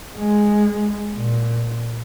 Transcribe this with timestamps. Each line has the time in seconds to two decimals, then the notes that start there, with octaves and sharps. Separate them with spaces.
0.18 G#3
1.17 A#2